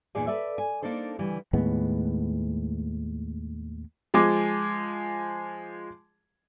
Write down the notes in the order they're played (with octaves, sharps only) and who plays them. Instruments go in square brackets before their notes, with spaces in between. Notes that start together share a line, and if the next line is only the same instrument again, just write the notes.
[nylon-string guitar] E2 A#2 D#4 G#4 D5 G#5
A4 B4 D5 E5
G#5
A#3 D4 D#4 A4 C5
D2 C#3 E3 G3
[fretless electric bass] D#2 A2 G#3 B3
[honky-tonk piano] F3 G#3 G#4 D6